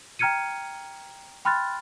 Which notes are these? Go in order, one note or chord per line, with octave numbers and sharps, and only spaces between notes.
G5 A#5 F6 G#6 C#7 D#7
G5 B5 C6 F6 F#6 A6